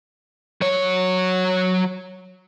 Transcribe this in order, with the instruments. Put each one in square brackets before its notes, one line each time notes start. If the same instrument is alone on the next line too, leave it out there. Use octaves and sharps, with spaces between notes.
[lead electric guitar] F#3 C#5